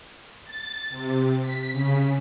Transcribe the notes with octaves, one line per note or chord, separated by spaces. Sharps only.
A6
C3
B6
C#3